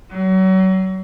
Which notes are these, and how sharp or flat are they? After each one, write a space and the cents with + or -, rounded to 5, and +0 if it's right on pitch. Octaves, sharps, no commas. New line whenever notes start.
F#3 +35